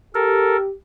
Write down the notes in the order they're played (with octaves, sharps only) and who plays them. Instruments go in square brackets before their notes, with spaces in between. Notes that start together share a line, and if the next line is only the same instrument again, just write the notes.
[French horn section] G4 [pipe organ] A4 A#4